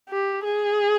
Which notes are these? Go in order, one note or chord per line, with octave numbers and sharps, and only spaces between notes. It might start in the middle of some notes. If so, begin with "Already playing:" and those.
G4
G#4